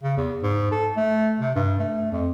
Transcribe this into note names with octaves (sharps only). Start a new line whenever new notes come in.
C#3
E2
G#2
A4
A3
C3
G2
A3
F2